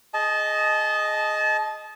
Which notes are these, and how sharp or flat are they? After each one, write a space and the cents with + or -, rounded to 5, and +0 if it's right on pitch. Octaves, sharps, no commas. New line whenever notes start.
G#4 +0 D#5 +0 A5 -25